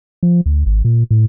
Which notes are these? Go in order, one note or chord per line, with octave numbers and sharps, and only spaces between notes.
F3
D2
G#1
A#2
A2